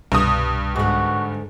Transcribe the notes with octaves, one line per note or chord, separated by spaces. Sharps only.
C2 G2 B2 D#6
G#2 D3 F#4